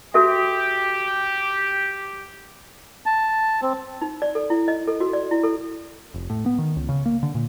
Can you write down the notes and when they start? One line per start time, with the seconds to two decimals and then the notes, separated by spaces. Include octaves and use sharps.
0.14 F#4 G4 A4 E5
3.06 A5
3.62 C4
4.02 D#4
4.22 D5
4.35 A4
4.50 E4
4.68 D#5
4.88 A4
5.00 F#4
5.13 D5
5.31 E4
5.44 A4
6.14 F1
6.30 A2
6.46 B3
6.58 D#3
6.76 C#2
6.89 C#3
7.06 A#3
7.23 D3
7.35 A#2